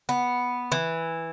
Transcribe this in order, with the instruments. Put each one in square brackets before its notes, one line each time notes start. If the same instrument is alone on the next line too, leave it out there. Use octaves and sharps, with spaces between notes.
[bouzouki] B3
E3